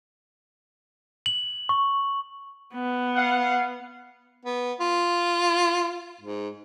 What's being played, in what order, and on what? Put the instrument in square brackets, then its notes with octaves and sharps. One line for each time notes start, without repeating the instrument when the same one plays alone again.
[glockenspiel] F#7
C#6
[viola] B3
[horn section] F5 F#5
[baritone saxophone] B3
F4
G#2